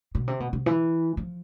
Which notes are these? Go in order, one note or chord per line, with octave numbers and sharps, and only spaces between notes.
B2
C3
B2
C3
E3
F3